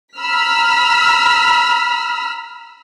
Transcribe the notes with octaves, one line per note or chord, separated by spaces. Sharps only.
A#5 B5 E6 F6 B6